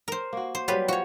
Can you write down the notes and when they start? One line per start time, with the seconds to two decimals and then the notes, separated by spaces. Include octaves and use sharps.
0.08 A#4 C5
0.33 A#3 F#4
0.55 C5
0.68 F#3 G3 F4 G4 B4
0.88 F3 F#4 C#5